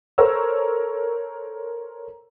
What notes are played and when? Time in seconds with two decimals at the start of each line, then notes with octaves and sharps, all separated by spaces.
0.18 A4 A#4 C5 C#5 A#5 E6